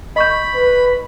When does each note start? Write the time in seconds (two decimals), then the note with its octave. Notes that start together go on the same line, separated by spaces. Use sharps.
0.16 D#5 B5 C#6 G6
0.55 B4